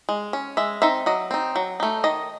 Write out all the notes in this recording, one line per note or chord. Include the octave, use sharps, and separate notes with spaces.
G#3
C#4
G#3 E5
C4 D#4 E5
F#3 D#5
C4 D#4
F#3
A3 D#4
D#3 D#5